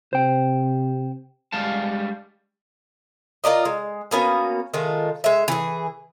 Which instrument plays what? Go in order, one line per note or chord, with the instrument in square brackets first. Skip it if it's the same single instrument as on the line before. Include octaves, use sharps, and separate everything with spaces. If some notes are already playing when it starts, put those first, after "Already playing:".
[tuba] C3 [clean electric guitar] C5 G5
[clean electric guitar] G3 G#3 F5 A5
[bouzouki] F4 A#4 D5 D#5
G#3
A#3 B3 C#4 F#4
D#3 G#3 A3 F4
G#3 E5
E3 G#4